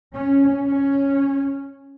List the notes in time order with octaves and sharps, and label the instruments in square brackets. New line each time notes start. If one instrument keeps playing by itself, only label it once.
[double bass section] C#4
C#4